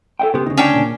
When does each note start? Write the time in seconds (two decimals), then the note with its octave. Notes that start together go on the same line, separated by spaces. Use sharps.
0.19 A4 E5 G5
0.34 C#3 B3 G4 C5
0.46 D2 C#3 D#4
0.57 C#4 D4 G5
0.74 A#2